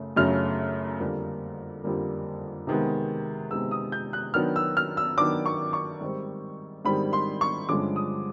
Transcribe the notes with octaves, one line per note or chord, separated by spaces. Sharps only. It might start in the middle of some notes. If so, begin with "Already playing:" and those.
Already playing: F#2 C#3 A3
F#2 C#3 F#3 A3 F6
F2 D3 G3 A#3
F2 D3 G3 A#3
C3 D#3 G#3 B3
C3 D#3 G#3 B3 E6
D#6
G6
F#6
D#3 F#3 B3 D4 F6
E6
F6
E6
D#3 F#3 B3 D4 D6
C#6
C#6
G#2 D#3 G3 C4
G#2 D#3 G3 C4 B5
C6
C#6
G2 D3 F3 G#3 C#4 D6
D#6